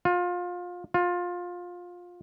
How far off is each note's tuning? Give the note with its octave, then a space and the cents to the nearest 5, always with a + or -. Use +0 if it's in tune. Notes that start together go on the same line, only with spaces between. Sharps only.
F4 +25
F4 +20